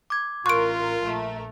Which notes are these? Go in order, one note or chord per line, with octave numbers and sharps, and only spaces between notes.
D6 G#6
A1 F4 A#4 C6 C#6 F#6 D7
A#1 A3 A#4